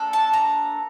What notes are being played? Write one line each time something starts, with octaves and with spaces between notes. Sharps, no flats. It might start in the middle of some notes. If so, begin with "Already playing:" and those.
Already playing: A#3 D4 A4
A5
A#5